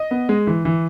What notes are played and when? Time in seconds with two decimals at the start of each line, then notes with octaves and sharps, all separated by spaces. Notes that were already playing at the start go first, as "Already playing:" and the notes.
Already playing: D#5
0.11 B3
0.29 G#3
0.47 E3
0.65 E3